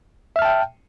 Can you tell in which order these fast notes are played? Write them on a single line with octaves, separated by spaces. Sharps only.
E5 F6 A5 G5